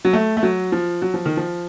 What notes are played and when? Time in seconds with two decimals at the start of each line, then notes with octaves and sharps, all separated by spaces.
0.05 F#3
0.13 A3
0.37 A3
0.43 F#3
0.72 F3
1.02 F#3
1.14 F3
1.26 D#3
1.37 F3